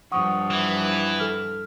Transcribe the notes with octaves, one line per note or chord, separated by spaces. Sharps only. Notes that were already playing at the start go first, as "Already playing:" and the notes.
G2 F3 F#5 C#6 D#6
E3
A4 F6